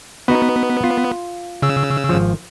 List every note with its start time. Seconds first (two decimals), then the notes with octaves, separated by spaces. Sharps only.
0.28 B3 D#4 F#4 B4
0.84 F4
1.62 C#3 E6
2.09 G#1 F3